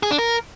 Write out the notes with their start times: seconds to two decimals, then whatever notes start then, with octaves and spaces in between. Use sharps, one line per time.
0.03 G#4
0.11 D4
0.19 A#4